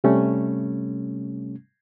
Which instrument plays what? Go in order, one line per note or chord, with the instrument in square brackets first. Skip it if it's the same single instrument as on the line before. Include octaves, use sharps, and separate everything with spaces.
[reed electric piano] C3 G3 A3 C#4